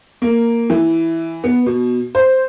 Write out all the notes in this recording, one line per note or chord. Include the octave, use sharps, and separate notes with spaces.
A#3
E3
B3
B2
C5